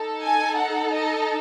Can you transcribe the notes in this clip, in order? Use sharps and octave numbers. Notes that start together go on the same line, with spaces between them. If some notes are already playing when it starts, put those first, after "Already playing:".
Already playing: D#4 A4
G#5
F#5
D#5